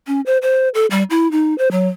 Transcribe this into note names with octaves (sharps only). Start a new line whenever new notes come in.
C#4
C5
C5
A4
G3
E4
D#4
C5
F#3